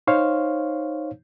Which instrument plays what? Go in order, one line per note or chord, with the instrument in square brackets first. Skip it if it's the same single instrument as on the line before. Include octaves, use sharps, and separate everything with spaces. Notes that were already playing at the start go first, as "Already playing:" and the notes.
[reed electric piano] D#4 C5 C#5 F5